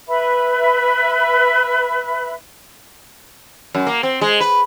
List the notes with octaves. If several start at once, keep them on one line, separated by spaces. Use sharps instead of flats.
B4 E5 B5
F#2
A#3
C4
G#3
B4